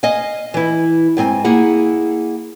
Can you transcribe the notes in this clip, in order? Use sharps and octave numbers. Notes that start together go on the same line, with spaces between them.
D#5 F5 G#5
E3 E4
D2 G#2 C4 G#5
A#3 E4 G#4 F#5